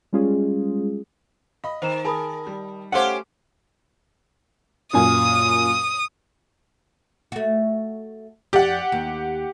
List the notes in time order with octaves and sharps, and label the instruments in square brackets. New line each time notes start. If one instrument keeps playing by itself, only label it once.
[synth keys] G3 G#3 C#4 F4 G#4
[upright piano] D#5 B5 [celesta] F5
[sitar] D#3 [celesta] C5 A#5 E7
[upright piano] G#4 A#4 [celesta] A5 B5 D#6
[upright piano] G3
[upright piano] A3 F5 D6 [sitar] C#4 G4 C5 [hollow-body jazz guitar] F#5
[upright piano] F#2 A#2 G#5 [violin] D#6
[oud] A3 F#4
[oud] F2 D5 [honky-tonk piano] G4 F#5
[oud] D#2